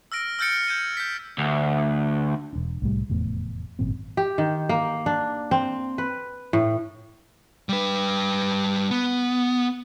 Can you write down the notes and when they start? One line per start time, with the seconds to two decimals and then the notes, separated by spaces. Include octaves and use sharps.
0.12 E6 F6 A#6 D7
0.39 E6 F6 G6 A6 C#7 D7
0.68 G6 G#6 D#7
0.97 G6 B6
1.38 D2
2.53 E1 D4
2.82 C2 A2 G3
3.10 F1 E2 A2 E3
3.79 G#1 F#2 A#2 C4
4.17 G4
4.38 D#3
4.69 A#3
5.06 D4
5.51 C4
5.98 B4
6.53 A2
7.69 G3 B4
8.91 B3